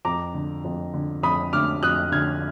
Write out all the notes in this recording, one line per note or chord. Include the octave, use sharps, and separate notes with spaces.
F2 A#5 D6
D3
F2
D3
F2 B5 D#6
D3 D6 F6
F2 D#6 F#6
D3 F6 G#6